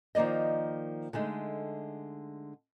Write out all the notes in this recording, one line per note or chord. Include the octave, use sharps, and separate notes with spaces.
D#3 F3 A#3 D5 D#5
D3 G#3 A3 D#4